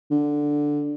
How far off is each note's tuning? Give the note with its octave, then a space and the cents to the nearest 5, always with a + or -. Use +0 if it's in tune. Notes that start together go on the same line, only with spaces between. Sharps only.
D3 +0